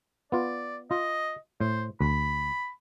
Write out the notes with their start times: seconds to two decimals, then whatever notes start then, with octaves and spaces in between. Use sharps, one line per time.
0.32 B3 F4 D5
0.91 F4 D#5
1.60 A2 C5
2.01 D2 B5